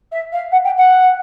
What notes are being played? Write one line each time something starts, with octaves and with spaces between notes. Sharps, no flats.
E5
F5
F#5
G5
F#5